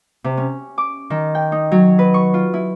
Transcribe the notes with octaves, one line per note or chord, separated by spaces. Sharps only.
C3
C#4
D6
D#3
G5
D#4
F#3
B4
C#6
F4
E4